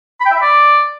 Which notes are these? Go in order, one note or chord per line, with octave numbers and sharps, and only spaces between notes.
B5
G5
E5
B5
D5